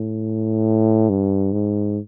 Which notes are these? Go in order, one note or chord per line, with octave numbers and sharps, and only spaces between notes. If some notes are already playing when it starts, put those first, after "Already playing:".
Already playing: A2
G2
G#2